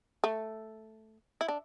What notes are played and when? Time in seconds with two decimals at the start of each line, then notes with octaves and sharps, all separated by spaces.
0.24 A3
1.41 E4
1.48 D4